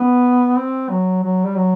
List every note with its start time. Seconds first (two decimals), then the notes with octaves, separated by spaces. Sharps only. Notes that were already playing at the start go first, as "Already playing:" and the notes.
Already playing: B3
0.57 C4
0.90 F#3
1.23 F#3
1.45 G3
1.56 F#3